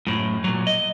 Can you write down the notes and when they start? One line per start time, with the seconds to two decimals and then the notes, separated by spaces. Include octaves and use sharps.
0.07 F#2 A2
0.44 A#2 F#3
0.67 D#5